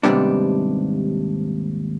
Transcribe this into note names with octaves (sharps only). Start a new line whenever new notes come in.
D#2 G#2 C3 G3 B3 D4